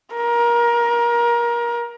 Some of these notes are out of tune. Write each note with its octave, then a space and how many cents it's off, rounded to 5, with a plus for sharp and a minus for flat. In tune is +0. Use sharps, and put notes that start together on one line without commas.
A#4 +25